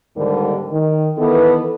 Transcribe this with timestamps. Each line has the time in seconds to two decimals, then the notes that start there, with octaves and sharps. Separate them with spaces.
0.16 D#2 G#2 D3 G3 A#4
0.70 D#3
1.17 D#3 E3 B3 A4